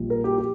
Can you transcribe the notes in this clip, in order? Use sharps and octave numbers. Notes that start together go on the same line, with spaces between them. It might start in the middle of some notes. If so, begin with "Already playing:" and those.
Already playing: A#1 A#2 G3
A#4
G4
G4